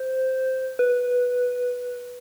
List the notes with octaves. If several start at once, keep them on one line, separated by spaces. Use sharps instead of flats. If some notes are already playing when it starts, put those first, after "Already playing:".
Already playing: C5
B4